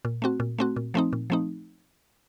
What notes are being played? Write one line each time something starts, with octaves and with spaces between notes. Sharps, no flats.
A#2
A3 C4 F#4
A#2
A3 C4 F#4
A#2
F3 A3 C4 D#4
A#2
F3 A3 C4 D#4